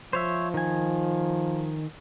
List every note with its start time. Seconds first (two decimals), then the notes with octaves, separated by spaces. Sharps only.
0.13 F3 C5 C#5 E5
0.54 D#3 G#5